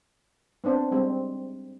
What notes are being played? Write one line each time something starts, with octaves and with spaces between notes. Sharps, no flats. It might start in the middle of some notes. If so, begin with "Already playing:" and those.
B3 C4 D4 C5
G3 G#3 C4